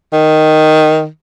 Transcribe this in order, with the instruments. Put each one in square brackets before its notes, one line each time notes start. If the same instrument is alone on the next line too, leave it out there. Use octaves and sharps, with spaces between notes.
[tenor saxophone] D#3